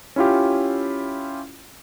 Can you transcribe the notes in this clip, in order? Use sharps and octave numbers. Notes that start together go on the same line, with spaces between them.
C#4 E4 F4 G4